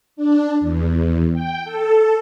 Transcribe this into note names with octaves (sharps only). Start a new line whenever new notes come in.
D4
E2
G5
A4